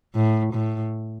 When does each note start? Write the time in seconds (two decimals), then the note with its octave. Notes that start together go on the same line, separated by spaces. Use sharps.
0.15 A2
0.53 A2